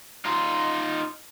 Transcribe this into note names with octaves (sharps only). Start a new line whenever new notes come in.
D#4 F4